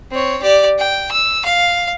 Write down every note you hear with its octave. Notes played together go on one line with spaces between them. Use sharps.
C4 C#5
G4 D5
G5
E6
F5